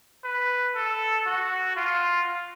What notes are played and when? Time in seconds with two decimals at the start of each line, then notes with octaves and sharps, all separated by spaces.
0.24 B4
0.75 A4
1.26 F#4
1.77 F4